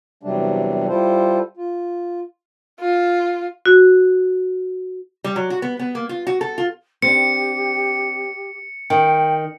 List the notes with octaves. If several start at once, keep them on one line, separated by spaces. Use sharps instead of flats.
E2 C3 F#3 G3 A3 D4
G3 E4 F4 A4 C5
F4
F4
F#4
G3
F#3
F#4
B3
B3
A#3
F4
F#4
A4
F4
C4 D4 G4 C#7
D#3 G5